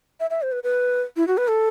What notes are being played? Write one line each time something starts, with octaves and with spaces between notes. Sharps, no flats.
E5
E5
C5
B4
B4
E4
F#4
B4
A4